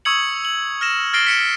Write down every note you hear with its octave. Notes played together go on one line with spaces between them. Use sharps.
C#6 D#6 E6 G#6 C#7 F#7
F#7
F6 A#6 E7
F6 A6 A#6 C7 D7 G7
B6 C#7 D7 E7